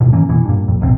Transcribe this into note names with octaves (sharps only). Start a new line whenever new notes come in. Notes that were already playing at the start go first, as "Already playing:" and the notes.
D2 G#2 B2
D#3 E3 A#3 C#4
F2 B2 E3
G2 A#2
F2
D#1 A1 B2 C4